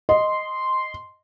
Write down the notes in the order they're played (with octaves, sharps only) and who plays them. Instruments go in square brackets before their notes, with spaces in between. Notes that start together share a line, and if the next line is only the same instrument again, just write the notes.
[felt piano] D#5 [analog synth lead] C6